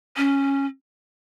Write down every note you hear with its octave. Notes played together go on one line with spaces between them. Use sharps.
C#4